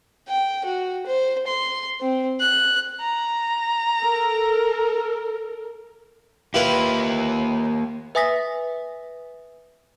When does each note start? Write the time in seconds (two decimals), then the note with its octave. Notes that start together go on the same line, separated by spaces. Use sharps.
0.29 G5
0.65 F#4
1.06 C5
1.47 C6
2.01 C4
2.40 F#6
3.01 A#5
3.99 A4 A#4
6.54 A#3 E4 F4 G4 B4
8.15 B4 E5 G#5 D#6 A#6 B6